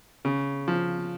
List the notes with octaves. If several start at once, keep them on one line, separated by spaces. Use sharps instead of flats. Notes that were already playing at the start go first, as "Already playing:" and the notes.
C#3
F3